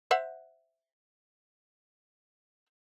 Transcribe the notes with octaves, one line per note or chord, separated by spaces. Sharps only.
C5 E5 F#5